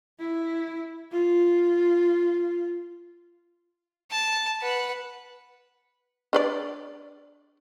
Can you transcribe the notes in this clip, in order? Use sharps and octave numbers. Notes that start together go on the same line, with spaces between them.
E4
F4
A5
B4 F#5
D4 B4 D5